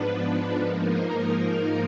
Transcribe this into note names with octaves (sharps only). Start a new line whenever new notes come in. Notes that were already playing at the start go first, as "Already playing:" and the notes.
Already playing: G#2 F3 B3 D4 B4
G#2 F3 A#3 D#4 A#4